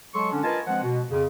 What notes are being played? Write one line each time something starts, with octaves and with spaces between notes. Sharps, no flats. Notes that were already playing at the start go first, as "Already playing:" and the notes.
F#3 G#3 A4 C6 C#6
D3 C#4 D4
F4 A#4 B4 D#5 G#5 A5
F3 G#3 C4 F#5
B2
F2 C#3